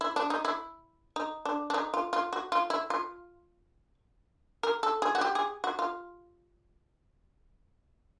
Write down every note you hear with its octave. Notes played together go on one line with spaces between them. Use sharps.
E4
D4
D#4
E4
D#4
D4
D4
D#4
F4
F4
F#4
F4
E4
F4
A#4
A4
G#4
F#4
G4
G#4
F#4
F4